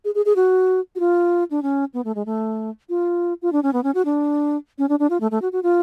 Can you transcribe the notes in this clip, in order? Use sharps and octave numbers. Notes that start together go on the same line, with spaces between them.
G#4
G#4
G#4
F#4
F#4
F4
D4
C#4
B3
A3
G#3
A3
F4
F4
D4
C#4
B3
C#4
F#4
D4
C#4
D4
D4
F4
A3
A3
F#4
F#4
F4